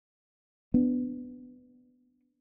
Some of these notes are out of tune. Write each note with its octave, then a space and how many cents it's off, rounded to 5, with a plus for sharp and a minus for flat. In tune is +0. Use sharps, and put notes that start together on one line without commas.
B3 +10 D4 +0